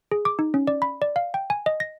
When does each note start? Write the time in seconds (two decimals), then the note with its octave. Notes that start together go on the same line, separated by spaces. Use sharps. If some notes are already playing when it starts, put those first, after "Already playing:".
0.12 G#4
0.25 D6
0.39 D#4
0.54 C#4
0.67 D5
0.82 B5
1.02 D5
1.16 F5
1.34 G5
1.50 G#5
1.66 D#5
1.80 A#6